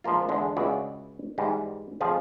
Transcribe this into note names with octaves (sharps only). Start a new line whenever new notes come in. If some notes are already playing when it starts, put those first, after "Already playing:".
F3 G#3 A#3 F4
E2 D3 G#3
C#2 E4 F#4 G#4 D5
G#2 E3 G3
F2 F3 F4 G#4 C5